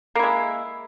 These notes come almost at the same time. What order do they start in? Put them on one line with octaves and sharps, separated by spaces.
A#3 E4 G#3